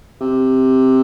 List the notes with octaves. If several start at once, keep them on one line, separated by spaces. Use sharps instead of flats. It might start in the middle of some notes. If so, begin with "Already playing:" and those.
C3